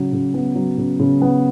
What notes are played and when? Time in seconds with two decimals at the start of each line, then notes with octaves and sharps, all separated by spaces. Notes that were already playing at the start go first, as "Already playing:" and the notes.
Already playing: C#3 F#3
0.13 C#3
0.34 B3
0.55 F#3
0.78 C#3
1.00 C#3
1.22 B3